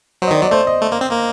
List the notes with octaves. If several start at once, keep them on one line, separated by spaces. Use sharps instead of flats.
F#3 C5
D#5
D#3 D5
F#3 D5
A3 C5
D#5
A3
A#3
C4
A#3